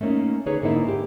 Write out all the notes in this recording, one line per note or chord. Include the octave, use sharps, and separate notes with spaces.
A3 A#3 C#4 D#4
D3 D#4 G#4 B4 C#5
G#2 D3 A#3 C4 D#4 E4
G4